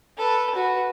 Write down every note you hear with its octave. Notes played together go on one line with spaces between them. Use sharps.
A4 B4
F#4 B4